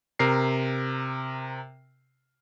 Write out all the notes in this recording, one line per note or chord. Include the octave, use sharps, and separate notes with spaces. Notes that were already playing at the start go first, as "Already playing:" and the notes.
C3 A#4 C7